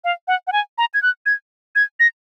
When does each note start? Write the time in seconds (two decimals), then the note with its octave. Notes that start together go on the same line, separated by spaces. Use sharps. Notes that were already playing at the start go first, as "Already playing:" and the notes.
0.04 F5
0.28 F#5
0.47 F#5
0.52 G#5
0.78 A#5
0.94 G#6
1.02 F#6
1.26 G#6
1.76 G#6
2.00 A#6